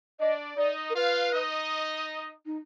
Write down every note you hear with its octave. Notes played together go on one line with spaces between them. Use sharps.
D4 D5 D#5
D#4 D5 D#5
A#4
F4 B4 F5
D#4 D#5
D#4